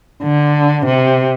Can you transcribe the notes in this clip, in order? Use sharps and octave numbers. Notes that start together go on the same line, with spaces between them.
D3
C3